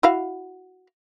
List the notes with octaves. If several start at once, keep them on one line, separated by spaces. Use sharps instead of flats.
E4 F#4 F5